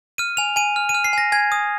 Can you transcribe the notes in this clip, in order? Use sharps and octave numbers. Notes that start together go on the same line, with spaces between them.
F6 D#7
G#5 F7
G#5 D#7
F6
D#7
F6
C7
G#5 A#6
G#5 G#6
D#6